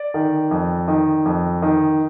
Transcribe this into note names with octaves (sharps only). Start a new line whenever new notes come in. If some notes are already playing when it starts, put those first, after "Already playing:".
Already playing: D5
D#3
F2
D#3
F2
D#3